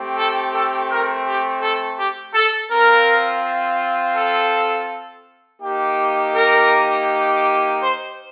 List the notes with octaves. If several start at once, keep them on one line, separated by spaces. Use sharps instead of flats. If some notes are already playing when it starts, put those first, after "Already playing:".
Already playing: A3 C4 G4
A4
A4
A#4
G4
A4
G4
A4
C4 F4 A#4
A4
A#3 D#4 G4
A#4
C5